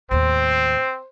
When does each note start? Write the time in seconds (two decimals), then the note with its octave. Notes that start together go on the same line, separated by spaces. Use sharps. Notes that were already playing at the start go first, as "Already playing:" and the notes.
0.11 D#2 A2 C4 C5